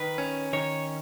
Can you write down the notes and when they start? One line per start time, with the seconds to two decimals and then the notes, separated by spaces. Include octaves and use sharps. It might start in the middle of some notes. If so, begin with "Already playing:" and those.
Already playing: D#3 B4
0.18 C#4
0.53 D#3 C#5